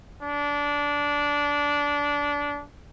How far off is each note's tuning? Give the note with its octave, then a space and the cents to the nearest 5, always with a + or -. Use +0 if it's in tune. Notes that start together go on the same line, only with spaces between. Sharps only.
D4 -20